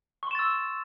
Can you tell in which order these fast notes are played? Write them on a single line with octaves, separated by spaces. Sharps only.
C#6 C6 E7 A6 E6